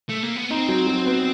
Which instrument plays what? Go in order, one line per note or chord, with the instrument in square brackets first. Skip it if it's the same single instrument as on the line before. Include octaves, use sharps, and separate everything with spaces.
[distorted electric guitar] A3
A#3
B3
[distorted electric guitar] C4 [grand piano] D#4
[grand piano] F#3
F#3
B3